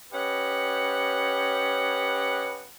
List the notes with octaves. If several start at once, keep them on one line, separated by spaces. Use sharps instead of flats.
C#4 G4 B4 D#5 F#5